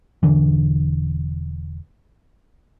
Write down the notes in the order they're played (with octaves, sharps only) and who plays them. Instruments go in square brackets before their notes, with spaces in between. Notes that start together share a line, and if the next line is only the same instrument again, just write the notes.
[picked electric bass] E1 D3 E3